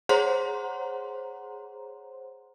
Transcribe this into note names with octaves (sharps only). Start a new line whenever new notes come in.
G#4 C5 C#5 F#5 A#5 C6